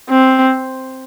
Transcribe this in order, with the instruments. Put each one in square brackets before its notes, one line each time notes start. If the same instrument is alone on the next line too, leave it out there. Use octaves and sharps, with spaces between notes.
[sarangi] C4